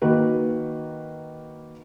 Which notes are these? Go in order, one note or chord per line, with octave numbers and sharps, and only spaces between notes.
D#3 A#3 F#4 B4